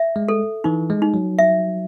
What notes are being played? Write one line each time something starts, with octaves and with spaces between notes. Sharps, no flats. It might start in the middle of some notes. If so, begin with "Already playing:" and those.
Already playing: E5
G#3
A4
E3 D#4
G#3
D#4
F#3
E5